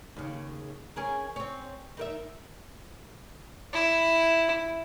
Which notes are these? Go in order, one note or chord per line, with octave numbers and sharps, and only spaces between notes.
D#2 C#3
C#4 G#4 A#4
C4 C#5
D#4 A#4 E5
E4